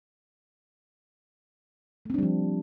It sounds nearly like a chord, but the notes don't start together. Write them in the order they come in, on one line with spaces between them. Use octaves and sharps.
A3 C4 D4 G3 F3